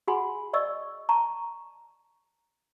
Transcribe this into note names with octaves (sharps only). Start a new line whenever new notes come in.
F#4 G#4 F#5 G#5 B5 C6
D5 D#5 C#6 E6
A5 A#5 C#6